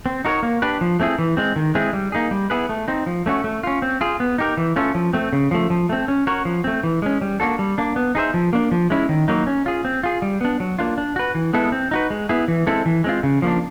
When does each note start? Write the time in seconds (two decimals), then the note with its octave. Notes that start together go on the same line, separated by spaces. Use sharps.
0.06 C4
0.25 D#4 F#4 A#4 C#5
0.43 A#3
0.62 D4 G4 B4
0.81 F3
1.00 A3 C4 E4 G#4
1.19 E3
1.37 G#3 C4
1.56 D#3
1.75 G#3 C4 E4 G#4
1.93 G3
2.12 A#3 D#4 G#4
2.31 G3
2.50 B3 E4 G#4 B4
2.69 A3
2.88 C4 D#4
3.06 F3
3.26 A3 C#4 F#4
3.44 A3
3.63 C#4 F4
3.82 C4
4.01 F4 G#4
4.20 B3
4.38 D#4 G4 A#4
4.57 E3
4.76 A3 C#4 F4 A4
4.95 F3
5.13 A3 C4
5.33 C#3
5.51 F3 A3
5.70 F3
5.89 A3 C4
6.08 C#4
6.27 F#4 A#4 C#5
6.45 F3
6.64 A3 C4
6.83 E3
7.02 G#3 C#4
7.22 G3
7.40 A#3 D4 F#4 A4
7.59 G3
7.78 A#3 D4
7.96 B3
8.15 D#4 G#4 C5 E5
8.34 F3
8.53 A#3 D4
8.71 F3
8.90 G#3 C#4 E4
9.09 D#3
9.28 F#3 A#3 D#4
9.47 C#4
9.66 F4 G#4
9.85 C4
10.03 F4 G#4
10.22 G3
10.41 B3 D4
10.60 F#3
10.79 A#3 D4 F4
10.98 D4
11.16 F#4 B4
11.35 E3
11.53 G#3 B3 E4 A4
11.72 C4
11.91 D#4 F#4 B4
12.10 G#3
12.29 B3 E4 G#4
12.48 E3
12.67 G#3 C4 E4 A4
12.86 E3
13.04 G#3 C4 F4
13.23 C#3
13.42 F3 A#3 D4